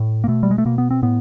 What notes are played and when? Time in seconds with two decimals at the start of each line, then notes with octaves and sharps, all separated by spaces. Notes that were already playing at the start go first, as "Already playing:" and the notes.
Already playing: A2
0.24 A#3
0.28 B2 A3
0.43 G3
0.51 G#3
0.58 A3
0.65 B2 A#3
0.78 B3
0.91 C4
1.02 A2 B3